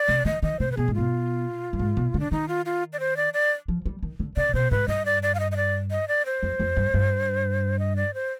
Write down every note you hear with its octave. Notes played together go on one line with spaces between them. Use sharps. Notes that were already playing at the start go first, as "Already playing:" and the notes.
Already playing: D5
C3
D#3 D#5
D#3 D#5
C3 C5
B4
B2 G#4
G#2
B2 F4
G2
G#2
B2
D3
D4
D#3 D#4
F4
F4
D5
C5
D5
D5
F3
G3
D#3
D3
C3 D5
B2 C5
G#2 B4
G2 D#5
D5
D5
F5
D#5
D#5
D5
D#5
D5
C5
F2
F2
G2
G2
D#5
D5
C5